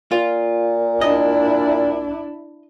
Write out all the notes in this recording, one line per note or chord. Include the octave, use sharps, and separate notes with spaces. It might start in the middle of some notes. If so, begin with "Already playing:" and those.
A#2 F4
D4 E4 D#5